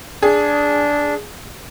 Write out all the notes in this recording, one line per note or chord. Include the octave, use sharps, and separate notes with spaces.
D4 G#4